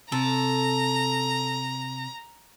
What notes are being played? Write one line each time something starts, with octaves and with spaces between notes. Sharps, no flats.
C3 A4 A#5